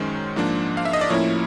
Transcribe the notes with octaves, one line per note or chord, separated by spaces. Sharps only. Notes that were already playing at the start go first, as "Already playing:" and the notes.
Already playing: F#2 D#3 G#3 C#4 C5
G#2 F3 A#3 D4
F5
E5
D#5
D5
A2 F3 A#3 C#4 E4 C#5